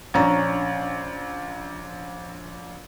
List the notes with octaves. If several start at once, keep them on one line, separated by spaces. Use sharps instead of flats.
A#1 C#4 D4 A#5